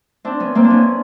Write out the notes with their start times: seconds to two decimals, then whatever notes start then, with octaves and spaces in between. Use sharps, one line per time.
0.25 C4 D4
0.40 B3 C#4
0.55 A#3 C4
0.64 D4
0.70 B3 C#4